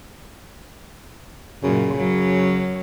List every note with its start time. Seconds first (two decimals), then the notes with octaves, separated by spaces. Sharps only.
1.63 F#2 A#2 C#3
1.95 F#2 F#3 C#4